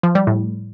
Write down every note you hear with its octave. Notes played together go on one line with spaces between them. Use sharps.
F3
G3
A2